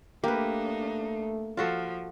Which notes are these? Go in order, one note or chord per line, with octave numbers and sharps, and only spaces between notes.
A3 A#3 D4 D#4 G4 B4
F3 F4 F#4 A4